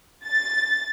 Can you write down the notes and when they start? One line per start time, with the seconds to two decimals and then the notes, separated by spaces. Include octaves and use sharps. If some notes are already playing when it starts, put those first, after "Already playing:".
0.25 A6